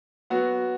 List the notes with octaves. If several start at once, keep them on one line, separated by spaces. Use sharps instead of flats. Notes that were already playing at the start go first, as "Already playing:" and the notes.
F#3 B3 F#4